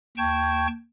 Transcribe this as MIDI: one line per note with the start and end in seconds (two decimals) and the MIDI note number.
0.17 0.67 39
0.17 0.67 79
0.17 0.67 81
0.17 0.67 85
0.17 0.67 91
0.17 0.67 92